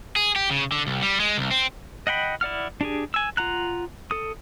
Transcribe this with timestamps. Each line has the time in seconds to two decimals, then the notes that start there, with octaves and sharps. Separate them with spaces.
0.16 G#4
0.36 G4
0.51 C#3
0.72 D3
0.87 C2
1.03 G3
1.20 G#3
1.38 C2
1.51 C4
2.07 D#5 F#5 G5 B5
2.41 E4 D5 F#5 F6
2.81 D4 G4 G#4
3.14 G#5 E6
3.37 F4 F#5 A#5 F#6
4.11 A4 D#6